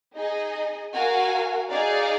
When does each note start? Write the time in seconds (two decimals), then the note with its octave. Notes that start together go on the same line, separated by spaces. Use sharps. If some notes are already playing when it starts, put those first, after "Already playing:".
0.16 D#4 G#4 D#5
0.94 F#4 A#4 F5 G#5
1.71 D#4 G#4 D5 F5